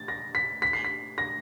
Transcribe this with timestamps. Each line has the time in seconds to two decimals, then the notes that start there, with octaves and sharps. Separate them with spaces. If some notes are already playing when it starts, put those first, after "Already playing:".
Already playing: A6
0.08 A#6
0.35 B6
0.62 B6
0.73 C7
0.85 B6
1.18 A#6